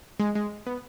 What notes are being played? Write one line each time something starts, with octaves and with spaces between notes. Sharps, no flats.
G#3
G#3
B3